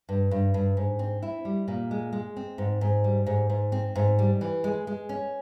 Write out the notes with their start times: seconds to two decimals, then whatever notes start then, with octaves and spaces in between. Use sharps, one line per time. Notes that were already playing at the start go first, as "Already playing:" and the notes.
0.09 G2
0.31 G2
0.54 G2
0.77 G#2
0.99 C4
1.22 E4
1.45 G3
1.68 A#2
1.91 G#3
2.13 G#3
2.37 C4
2.58 G#2
2.81 G#2
3.04 G3
3.26 G#2
3.50 G#2
3.72 C4
3.95 G#2
4.19 G3
4.41 E3
4.64 G#3
4.87 G#3
5.09 C#4